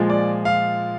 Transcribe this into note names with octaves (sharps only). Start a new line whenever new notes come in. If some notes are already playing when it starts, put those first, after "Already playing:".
Already playing: A#2 F3 G#3
D5
F5